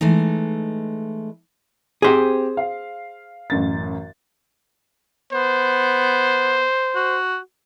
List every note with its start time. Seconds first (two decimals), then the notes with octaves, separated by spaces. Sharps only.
0.01 E3 G#3 A3 D#4
2.02 C4 G4 G#4 C5
2.57 F5
3.50 A1 F#2 A6
5.33 B3 C5
6.95 F#4